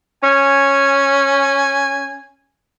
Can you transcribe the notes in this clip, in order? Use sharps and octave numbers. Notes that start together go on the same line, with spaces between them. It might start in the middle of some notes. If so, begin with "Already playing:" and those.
C#4 G#5